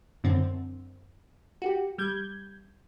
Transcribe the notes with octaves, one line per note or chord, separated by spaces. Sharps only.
F#2 D3 C4
F#4 G4
G3 G6 G#6